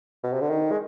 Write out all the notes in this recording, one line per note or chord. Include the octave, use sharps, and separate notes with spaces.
B2
C3
D3
D#3
G#3